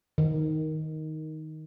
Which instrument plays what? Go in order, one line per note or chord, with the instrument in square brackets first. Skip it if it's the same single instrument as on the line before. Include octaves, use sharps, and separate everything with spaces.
[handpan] D#3